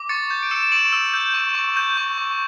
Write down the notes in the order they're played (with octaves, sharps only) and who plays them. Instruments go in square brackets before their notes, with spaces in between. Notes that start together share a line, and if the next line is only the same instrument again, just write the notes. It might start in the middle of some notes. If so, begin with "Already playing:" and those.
Already playing: [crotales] D6
C#6 A6 C#7
G6
D7
E6 C#7 E7
E7
C#6 D7 F#7
E6
G6
C#6
C#6
G6
C#6
C#6